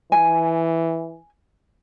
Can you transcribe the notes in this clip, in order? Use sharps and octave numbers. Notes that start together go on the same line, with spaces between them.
E3 G#5